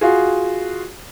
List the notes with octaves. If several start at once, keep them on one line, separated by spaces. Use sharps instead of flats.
F4 F#4 G#4